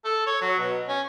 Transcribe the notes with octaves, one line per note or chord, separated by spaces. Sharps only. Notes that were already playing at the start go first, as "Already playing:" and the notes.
A4
C#5
F#3
B2
C#4